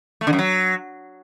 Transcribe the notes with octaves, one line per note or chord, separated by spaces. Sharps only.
A3
D3
F#2
F#3